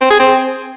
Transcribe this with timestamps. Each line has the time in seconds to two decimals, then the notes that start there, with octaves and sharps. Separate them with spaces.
0.01 C4
0.10 G#4
0.20 C4